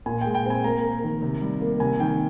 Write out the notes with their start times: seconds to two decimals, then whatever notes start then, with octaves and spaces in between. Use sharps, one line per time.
0.06 A#2 G#5
0.21 G#3 G5
0.35 G5
0.46 C4 G#5
0.64 A#3 A#5
0.84 A#3
1.04 D#3
1.22 C3
1.41 G3
1.61 A#3
1.80 C3 G#5
2.00 D#3 G5